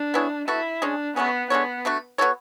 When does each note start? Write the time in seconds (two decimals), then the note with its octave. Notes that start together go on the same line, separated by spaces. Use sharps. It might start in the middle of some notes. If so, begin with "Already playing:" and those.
Already playing: D4
0.14 B3 E4 G#4 C#5
0.48 B3 E4 F#4 A4
0.82 G#3 C#4 D4 G#4
1.16 F#3 A3 B3 C#4 G#4
1.50 G#3 B3 D4 A4 C#5
1.85 D3 A3 D4 F#4
2.18 B3 F#4 A4 C#5